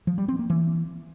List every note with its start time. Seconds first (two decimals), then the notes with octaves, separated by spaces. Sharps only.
0.07 F3
0.18 G3
0.28 C4
0.39 A#3
0.50 E3